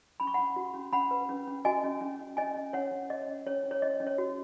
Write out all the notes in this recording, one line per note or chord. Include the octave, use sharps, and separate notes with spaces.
C#4 B5
C#6
C#4 F#5 B5
F#4
C#4
C#4 F#5 B5
B4
C#4
C#4
F#4 D#5 G#5
C#4
C#4
C#4
C#4 D#5 G#5
C#4
C#4 C#5 F#5
C#4
C#5 D#5
C#4
C#4 C#5
C#4
C#5
C#4 D#5
C#4
C#5
F#4